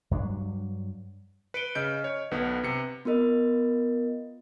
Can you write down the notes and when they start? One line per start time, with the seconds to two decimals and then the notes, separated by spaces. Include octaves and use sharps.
0.11 G2 F#3 D4
1.54 B4 C#7 D7 G7
1.75 C#3 D#5 F6 G6 D7
2.04 C#5
2.31 B1 D3 B3 B4
2.64 C3 C#7
3.05 B3 F4 A#4 D#5